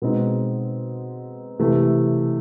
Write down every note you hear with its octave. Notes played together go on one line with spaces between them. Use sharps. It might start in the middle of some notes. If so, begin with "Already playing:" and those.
B2 G#3 C4 D#4
C3 E3 A3